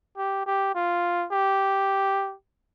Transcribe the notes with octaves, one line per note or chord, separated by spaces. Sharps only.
G4
G4
F4
G4